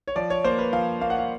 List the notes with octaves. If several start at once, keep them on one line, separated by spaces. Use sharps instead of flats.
C#5
F3 D5
C#5
A#3 C5
B4
F3 F5
A#3 F5
F#5
F5